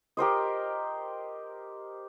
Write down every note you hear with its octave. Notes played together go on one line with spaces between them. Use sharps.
G4 A#4 C5 D#5